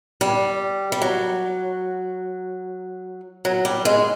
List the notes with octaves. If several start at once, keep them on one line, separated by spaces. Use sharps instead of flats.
G3
G3
F#3
F#3
G3
G#3